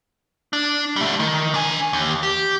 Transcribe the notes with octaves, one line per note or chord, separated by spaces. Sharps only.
D4
G3 A3
D#3
D4 G#5
D#2
G4